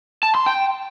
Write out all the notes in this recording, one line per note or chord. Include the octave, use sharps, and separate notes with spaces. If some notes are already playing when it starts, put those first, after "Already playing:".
A5
C6
G5